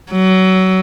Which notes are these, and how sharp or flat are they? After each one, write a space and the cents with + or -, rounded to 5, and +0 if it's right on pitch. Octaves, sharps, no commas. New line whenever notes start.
F#3 +25